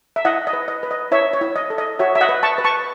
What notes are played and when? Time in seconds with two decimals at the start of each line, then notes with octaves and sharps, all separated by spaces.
0.16 E5
0.25 E4 D#5 F#5
0.47 D#5
0.53 B4
0.68 D#5
0.83 B4
0.91 D#5
1.11 E4 C#5 E5
1.33 C#5
1.41 E4
1.56 D#5
1.70 A4
1.78 D#5
1.99 F#4 C#5 E5
2.15 E5
2.21 D#5 F#5
2.29 B4
2.43 A5 C#6
2.58 B4
2.64 A5 C#6